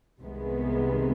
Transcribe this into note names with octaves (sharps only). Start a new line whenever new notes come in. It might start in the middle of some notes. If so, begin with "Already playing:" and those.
C2 C3 D#3 G#3 B3